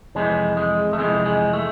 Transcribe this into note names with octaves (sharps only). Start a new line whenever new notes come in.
F2 C3 E3 G#3
G#3
A3
F2 C3 E3 G#3
G#3
A3